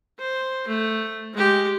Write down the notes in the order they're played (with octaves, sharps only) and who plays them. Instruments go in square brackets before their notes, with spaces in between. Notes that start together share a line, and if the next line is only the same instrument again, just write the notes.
[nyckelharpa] C5
A3
G#3 G4